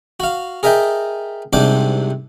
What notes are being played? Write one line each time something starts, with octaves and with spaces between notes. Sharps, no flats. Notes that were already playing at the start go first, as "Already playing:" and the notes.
F#4 F5
G#4 A#4 D#5 E5 G5 A5
C2 G#2 C3 D4 C5 D6